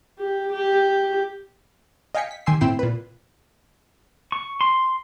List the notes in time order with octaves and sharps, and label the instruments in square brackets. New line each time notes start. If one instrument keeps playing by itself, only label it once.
[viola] G4
G4
[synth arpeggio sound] D#5 F5 G5 G#5 B6 C#7
B6
D#3 G4 G#5 C6 E6 C7
A2 C4 E4 G5 C7 E7
A#2 B4
[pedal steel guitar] C#6
C6